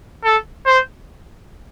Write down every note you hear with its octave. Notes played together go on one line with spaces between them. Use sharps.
A4
C5